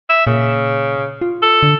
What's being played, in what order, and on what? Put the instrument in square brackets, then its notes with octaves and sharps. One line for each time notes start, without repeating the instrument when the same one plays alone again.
[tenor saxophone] E5
[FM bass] A#2 [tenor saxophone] C#3
[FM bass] F4
[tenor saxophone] A4
[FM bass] D3